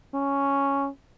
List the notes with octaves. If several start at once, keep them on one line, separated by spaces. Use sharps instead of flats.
C#4